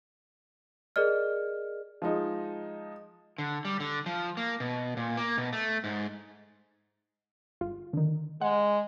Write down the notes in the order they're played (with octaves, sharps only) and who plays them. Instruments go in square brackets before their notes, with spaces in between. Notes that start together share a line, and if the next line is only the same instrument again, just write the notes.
[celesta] G#4 A#4 D5 D#5 F6
[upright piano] F3 G#3 D#4
[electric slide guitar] D3
G3
D3
F3
A#3
B2
A#2
A#3
B2
A3
G#2
[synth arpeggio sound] G1 F4
D3 D#3
[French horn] G#3 [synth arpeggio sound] F#5